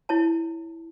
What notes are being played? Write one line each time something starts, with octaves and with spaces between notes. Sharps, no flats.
E4 C#5 A5